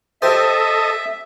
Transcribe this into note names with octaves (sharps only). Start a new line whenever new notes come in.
G4 A4 C5 D#5 E5